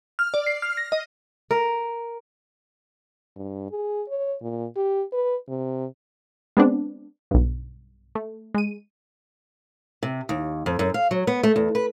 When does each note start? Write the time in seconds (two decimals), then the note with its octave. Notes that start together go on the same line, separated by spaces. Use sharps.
0.19 F6
0.34 D5
0.46 C7
0.62 F6
0.77 A#6
0.92 D#5
1.51 A#4
3.36 G2
3.71 G#4
4.09 C#5
4.42 A#2
4.77 G4
5.13 B4
5.49 C3
6.57 G#3 B3 C4 D4
7.31 B1 G2
8.15 A3
8.54 G#3 D#7
10.03 C3
10.29 D#2
10.66 F2
10.79 F#2
10.94 F5
11.11 F#3
11.27 B3
11.43 A3
11.56 E2
11.75 B4